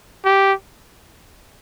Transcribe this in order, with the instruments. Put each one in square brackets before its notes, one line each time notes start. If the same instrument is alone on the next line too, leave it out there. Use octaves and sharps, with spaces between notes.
[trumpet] G4